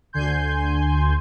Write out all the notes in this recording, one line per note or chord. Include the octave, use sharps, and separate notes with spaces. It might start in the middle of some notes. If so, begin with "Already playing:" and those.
D2 D3 G#5 C6 G6